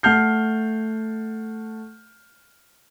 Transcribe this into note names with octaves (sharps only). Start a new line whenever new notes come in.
A3 F#5 A5 F6 G6 C7